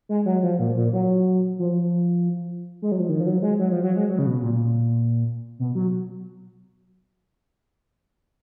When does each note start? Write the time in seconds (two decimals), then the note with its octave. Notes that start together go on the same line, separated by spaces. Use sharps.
0.09 G#3
0.26 F#3
0.43 F3
0.59 A#2
0.77 A#2
0.93 F#3
1.59 F3
2.82 G#3
2.92 F#3
3.00 F3
3.09 D#3
3.20 F3
3.26 F#3
3.42 G#3
3.59 F#3
3.71 F3
3.83 F#3
3.96 G#3
4.10 F#3
4.19 C#3
4.26 B2
4.42 A#2
5.59 B2
5.75 F#3